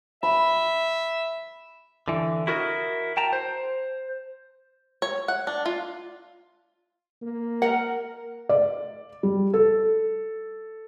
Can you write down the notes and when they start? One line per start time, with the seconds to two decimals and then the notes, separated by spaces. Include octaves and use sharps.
0.23 E5 B5
2.08 D3 E3
2.47 E4 F#4 A#4 C#5 D#5
3.17 G5 A5 A#5
3.33 C5
5.02 C#5
5.28 F#5
5.47 D4
5.66 F4
7.22 A#3
7.62 A#4 F#5
8.49 D5
9.23 G3
9.54 A4